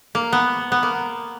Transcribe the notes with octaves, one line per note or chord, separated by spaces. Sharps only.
A#3
B3
B3
A#3